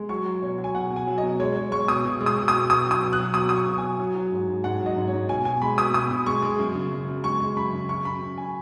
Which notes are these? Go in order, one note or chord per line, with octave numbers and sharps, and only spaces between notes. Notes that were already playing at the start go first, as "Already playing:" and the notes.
Already playing: G#3
F#3 C#6
F#3
B2 C#5
F#3
G#5
B2 F#5
B2
G#5
F#3
D#5
B2
G#3 C#5
G#3 C#5
G#3 C#6
B2 D#6
B2
G#3
D#6
B2
D#6
B2
B2 D#6
F#3 D#6
B2
F#6
F#3
B2 D#6
F#3 D#6
C#6
B2
F#3 G#5
F#3
F#3
G#2
G#2
G#2 F#5
F#3
D#5
G#2
C#5
G#2
B2 G#5
B2 G#5
G#3 B5
B2 D#6
B2 D#6
B2
G#3 C#6
G#3
F#2
C#3
F#2
F#2
G#3 C#6
G#3
F#2 B5
C#3
F#2 C#6
F#2 B5
F#2
G#5